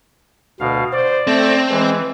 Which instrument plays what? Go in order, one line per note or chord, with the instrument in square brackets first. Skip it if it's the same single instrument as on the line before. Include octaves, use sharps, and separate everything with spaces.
[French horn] D2 [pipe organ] B2 F5
[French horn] C5 [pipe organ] D5
[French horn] A3 [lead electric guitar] C4
[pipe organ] E3 [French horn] G#3